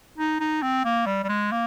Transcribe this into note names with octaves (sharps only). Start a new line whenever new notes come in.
D#4
D#4
C4
A#3
G3
G3
G#3
A#3